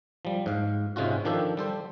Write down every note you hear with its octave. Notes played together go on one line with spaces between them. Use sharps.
F3 G3
G#2 F5
G#2 C3 G#3 C#4 F4 F#4
D#3 F3 D4 G4 A4
G3 A4 C5